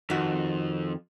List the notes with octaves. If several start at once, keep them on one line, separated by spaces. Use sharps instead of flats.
F2 D#3 F#4